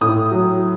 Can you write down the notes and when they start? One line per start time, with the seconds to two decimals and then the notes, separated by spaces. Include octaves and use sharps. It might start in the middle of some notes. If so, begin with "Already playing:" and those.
0.01 A2 D#6
0.31 F#3